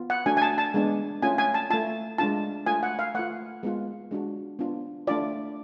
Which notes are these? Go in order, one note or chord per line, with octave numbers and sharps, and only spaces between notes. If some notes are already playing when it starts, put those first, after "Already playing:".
Already playing: B3 F4
F#5
A3 D4 F#4 G#5
G#5
A5
A5
G#3 B3 D4
A3 C#4 F4 G#5
G#5
A5
A3 F4 A5
G#3 D4 F4 A5
A3 F4 G#5
F#5
F5
A3 F4 F#5
G#3 B3 F4
G#3 D4 F#4
B3 D4 F4
A3 D4 F4 D5